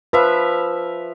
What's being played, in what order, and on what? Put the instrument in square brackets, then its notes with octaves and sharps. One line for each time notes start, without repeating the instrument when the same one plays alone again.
[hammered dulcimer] F3 E5 F5 [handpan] B4